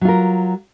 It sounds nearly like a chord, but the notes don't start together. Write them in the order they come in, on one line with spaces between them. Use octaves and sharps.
F#3 F4 A#4